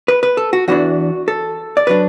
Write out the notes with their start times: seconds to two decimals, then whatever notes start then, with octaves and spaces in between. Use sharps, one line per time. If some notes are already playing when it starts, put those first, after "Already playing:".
0.08 B4
0.23 B4
0.37 A4
0.53 F#4
0.68 E2 E3 D4 F#4
1.28 A4
1.77 D5
1.87 F#3 D4 B4